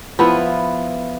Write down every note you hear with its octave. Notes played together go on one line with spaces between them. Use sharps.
F3 B3 E4 B4